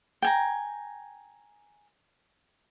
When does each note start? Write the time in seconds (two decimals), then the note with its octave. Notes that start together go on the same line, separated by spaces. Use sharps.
0.22 G5 G#5 A#5